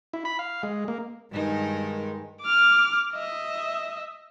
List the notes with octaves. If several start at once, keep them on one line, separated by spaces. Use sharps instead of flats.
E4
B5
F5
G#3
A#3
G2 D#3 G#3 D#4 A#4
D6 F6
D#5 E5